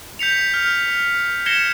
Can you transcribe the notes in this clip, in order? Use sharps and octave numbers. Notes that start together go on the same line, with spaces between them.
G6 B6 C#7 F7
F6
G#6 A#6 C7 C#7 E7 G7